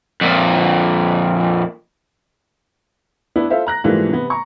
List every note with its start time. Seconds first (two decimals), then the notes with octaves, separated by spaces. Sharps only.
0.21 F2 A#2
3.36 B3 D4 E4 B4
3.50 F4 A4 C5 E5 F5
3.67 A#5 F#6 A#6
3.84 G#2 E3 F3 G3 A3 A#3
4.09 C3 B3
4.30 A#5 C#6